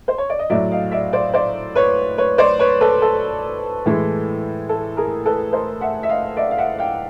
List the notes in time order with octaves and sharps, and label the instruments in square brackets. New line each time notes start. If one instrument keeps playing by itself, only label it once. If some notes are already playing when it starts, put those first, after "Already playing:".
[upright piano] C5
C#5
D5
D#5
A2 F#3 D5 E5
D#5 F5
D5 E5
C5 D5
C5 D5
B4 C#5
B4 C#5
C5 D5
B4 C#5
A4 B4
A4
A2 E3 G#3
A4
G#4 A#4
A4 B4
A#4 C5
E5 F#5
E5
D#5 F5
D5 E5
F5
E5 F#5
F5 G5